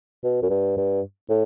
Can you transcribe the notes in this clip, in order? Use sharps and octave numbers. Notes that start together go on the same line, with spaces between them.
B2
F#2
G2
G2
A2